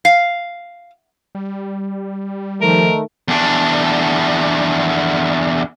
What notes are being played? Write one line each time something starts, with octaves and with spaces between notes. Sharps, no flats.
F5
G3
D#3 F3 A3 A#4
E2 D4